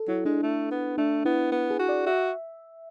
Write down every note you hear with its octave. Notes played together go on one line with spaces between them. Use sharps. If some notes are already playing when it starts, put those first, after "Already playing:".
Already playing: A4
F#3 E4
G#3 D4
A3
B3
A3 D4
B3 E4
B3
G#4
F#4
D5
F#4 E5